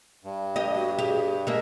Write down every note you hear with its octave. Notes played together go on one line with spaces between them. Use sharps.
G2
G4 D#5
F#4
G4 G#4
G#3 A#3 E5